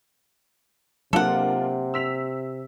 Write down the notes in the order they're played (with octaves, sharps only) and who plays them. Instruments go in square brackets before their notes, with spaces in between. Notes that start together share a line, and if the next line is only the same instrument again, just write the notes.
[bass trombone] C3 [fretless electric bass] F#3 A#3 [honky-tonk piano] D4 F4 A#4 [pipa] A4 F#5
[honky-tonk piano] E6 B6 F7